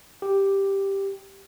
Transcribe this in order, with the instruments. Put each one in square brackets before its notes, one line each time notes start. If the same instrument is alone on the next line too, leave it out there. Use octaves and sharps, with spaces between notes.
[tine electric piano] G4